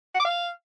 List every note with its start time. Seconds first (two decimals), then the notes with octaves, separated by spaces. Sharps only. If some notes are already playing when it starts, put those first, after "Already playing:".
0.15 F#5
0.20 D6
0.25 F5